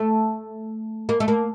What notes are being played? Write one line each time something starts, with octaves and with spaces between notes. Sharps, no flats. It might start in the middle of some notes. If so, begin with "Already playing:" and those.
Already playing: A3
A#3
A3
A#3